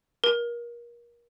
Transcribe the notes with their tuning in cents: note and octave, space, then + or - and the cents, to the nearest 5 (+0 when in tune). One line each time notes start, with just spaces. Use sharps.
A#4 +30